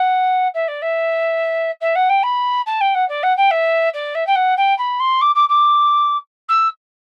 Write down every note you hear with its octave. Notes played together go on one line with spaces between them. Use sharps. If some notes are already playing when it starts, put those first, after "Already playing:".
Already playing: F#5
E5
D5
E5
E5
F#5
G5
B5
A5
G5
F#5
D5
F#5
G5
E5
D5
E5
G5
F#5
G5
B5
C6
D6
D6
D6
E6